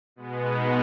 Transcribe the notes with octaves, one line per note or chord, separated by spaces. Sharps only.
B2 G#3 B3
D#4